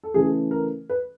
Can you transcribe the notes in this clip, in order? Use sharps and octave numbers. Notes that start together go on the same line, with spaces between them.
A4
C#3 E3 A3 C#4 G#4
A#4
B4